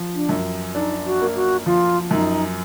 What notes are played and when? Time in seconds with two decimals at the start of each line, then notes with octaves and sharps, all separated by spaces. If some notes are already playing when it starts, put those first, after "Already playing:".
Already playing: F3
0.15 D4
0.29 F#2
0.75 D4 D#4
1.05 F#4
1.21 A#3
1.36 F#4
1.66 F3 F4
2.11 F#2 D#4